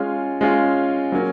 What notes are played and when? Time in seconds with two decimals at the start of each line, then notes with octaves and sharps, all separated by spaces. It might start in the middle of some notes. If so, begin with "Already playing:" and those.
Already playing: G#3 C#4 F4
0.41 G#3 C#4 F4
1.12 F#3 A#3 C#4